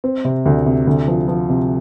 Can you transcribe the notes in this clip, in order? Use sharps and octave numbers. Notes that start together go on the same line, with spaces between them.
C4
C3
D2
C3
D2
F3
F3
C3